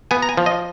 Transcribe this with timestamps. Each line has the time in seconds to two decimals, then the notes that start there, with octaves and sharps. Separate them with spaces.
0.11 B3 G#5
0.22 A#5
0.29 G#5
0.37 F3
0.46 D#5